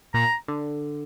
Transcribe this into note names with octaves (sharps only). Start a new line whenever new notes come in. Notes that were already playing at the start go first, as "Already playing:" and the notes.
A#2 A#5
D3